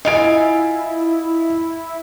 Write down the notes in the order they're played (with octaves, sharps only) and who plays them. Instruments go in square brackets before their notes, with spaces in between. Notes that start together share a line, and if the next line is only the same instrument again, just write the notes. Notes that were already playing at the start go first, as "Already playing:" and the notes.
[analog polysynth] E4 [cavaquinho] F4 F5 G#5 [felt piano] D#5 D7